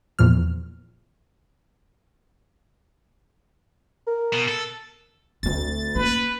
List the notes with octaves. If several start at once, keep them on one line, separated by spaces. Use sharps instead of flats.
E2 A#2 F3 F6
A#4
B2
A4
D2 C4 D4 A6
A#3 C#4 B4